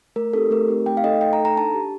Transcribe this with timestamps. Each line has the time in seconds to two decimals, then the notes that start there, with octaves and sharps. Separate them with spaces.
0.16 A3 A#4
0.33 C4 D#4 G4 A4
0.51 A3 A#4
0.68 C4 D#4 G4
0.86 A3 G5
0.97 F5
1.04 D#4 A4 D#5
1.21 A3 G5
1.33 A#5
1.39 D#4 A4
1.45 A#5
1.57 D4 A5
1.74 G4